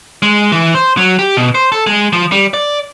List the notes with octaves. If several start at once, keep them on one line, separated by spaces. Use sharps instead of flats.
G#3
E3
C5
F#3
G4
B2
C5
A4
G#3
F3
G3
D5